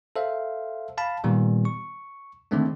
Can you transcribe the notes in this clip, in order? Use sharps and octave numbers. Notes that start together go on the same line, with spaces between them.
A4 C5 E5 F5
F5 A5 B5
A#2 D#3 G3 B3
C#6
D3 D#3 G#3 A3 C4 D4